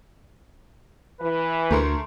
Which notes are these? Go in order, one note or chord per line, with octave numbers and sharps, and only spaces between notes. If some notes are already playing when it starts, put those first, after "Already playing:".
E3 B4
D2 A3 A#4 C6